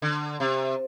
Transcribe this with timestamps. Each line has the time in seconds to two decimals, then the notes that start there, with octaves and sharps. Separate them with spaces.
0.02 D3
0.40 C3